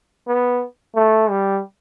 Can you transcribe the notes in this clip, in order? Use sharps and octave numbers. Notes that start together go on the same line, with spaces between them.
B3
A3
G3